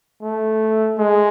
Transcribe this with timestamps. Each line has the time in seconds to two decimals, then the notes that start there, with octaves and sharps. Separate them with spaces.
0.23 A3
0.99 G#3